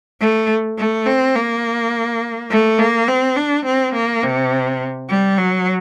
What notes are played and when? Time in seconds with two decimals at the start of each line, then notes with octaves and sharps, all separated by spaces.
0.21 A3
0.78 A3
1.06 C4
1.35 A#3
2.50 A3
2.79 A#3
3.08 C4
3.36 D4
3.65 C4
3.94 A#3
4.23 C3
5.09 G3
5.38 F#3